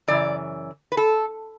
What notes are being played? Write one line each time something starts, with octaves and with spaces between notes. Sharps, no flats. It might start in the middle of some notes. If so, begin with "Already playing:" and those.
F#2 C#3 E3 D5
B4
A4